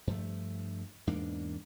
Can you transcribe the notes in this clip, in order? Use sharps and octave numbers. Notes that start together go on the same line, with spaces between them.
G2 F3 A3
E2 G#2 A#3 D4